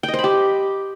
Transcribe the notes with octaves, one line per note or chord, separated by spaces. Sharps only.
G5
D#5
C5
B5
G4